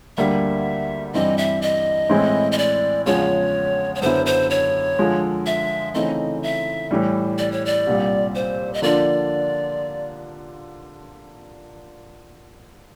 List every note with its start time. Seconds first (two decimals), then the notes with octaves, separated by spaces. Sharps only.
0.17 D2 D3 G3 A#3 E5
1.14 G2 E3 G3 C4 E4 D#5
1.38 E5
1.62 D#5
2.09 A2 E3 G#3 C4 E4
2.52 D#5
2.58 D5
3.06 E2 C#3 F3 G#3 C#4 C#5
3.95 C#5
4.02 F#2 D3 F#3 B3 E4 C5
4.26 C5
4.50 C#5
4.99 D3 F3 G#3
5.46 E5
5.94 C#3 E3 A3 C4 D#4 D#5
6.43 E5
6.91 A2 E3 G3
7.38 D5
7.52 C#5
7.65 D5
7.87 C2 A#2 G3
8.35 C5
8.74 D#5
8.82 D3 F3 A#3 D4 F4 D5